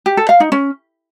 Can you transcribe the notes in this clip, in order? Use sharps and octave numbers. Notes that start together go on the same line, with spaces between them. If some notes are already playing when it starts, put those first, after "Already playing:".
G4
A4
F5
D#4
C#4